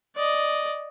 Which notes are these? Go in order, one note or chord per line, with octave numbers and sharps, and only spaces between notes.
D5 D#5